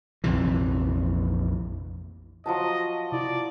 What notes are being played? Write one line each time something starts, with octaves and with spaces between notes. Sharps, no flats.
A#1 F2 C3 E3
F3 F#3 D#5 A5
C3 E4 F4 D5